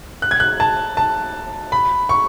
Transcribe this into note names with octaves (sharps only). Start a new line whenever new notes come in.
F#6
G#6
F#6
A5
A5
B5
C#6